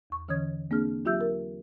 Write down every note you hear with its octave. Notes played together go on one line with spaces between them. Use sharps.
E2 C#6
D3 E3 C#4 C#5 D#6 G#6
A#3 C4 D4 G#4 F6
F#3 F4 G4 E5 E6 G6
A#4